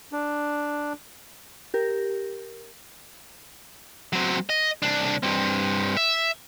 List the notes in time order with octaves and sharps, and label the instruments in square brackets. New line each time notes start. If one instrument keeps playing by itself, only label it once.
[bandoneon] D4
[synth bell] G4 A#4
[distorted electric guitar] F#3 C4
D#5
C2 D4
G2 C4
E5